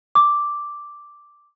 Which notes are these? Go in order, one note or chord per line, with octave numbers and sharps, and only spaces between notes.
D6